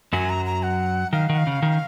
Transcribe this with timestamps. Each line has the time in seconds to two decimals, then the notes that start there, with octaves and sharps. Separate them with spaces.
0.13 F#2 F#3 G#5
0.30 A#5
0.46 A#5
0.63 F#5
1.13 D#3 F5
1.29 D#3 F#5
1.38 F5
1.47 C#3
1.62 D#3